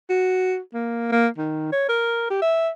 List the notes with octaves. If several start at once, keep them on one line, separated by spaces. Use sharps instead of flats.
F#4
A#3
A#3
D#3
C#5
A#4
G4
E5